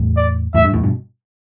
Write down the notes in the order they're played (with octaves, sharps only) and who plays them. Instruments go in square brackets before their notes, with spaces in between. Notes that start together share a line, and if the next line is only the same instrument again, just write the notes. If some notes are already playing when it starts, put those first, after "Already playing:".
Already playing: [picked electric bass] E2 A2
[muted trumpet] D5
[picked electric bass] E2 A2 [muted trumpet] E5
[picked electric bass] G2
E2 A2
G2 B2